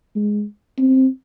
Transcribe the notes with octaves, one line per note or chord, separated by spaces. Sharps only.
G#3
C4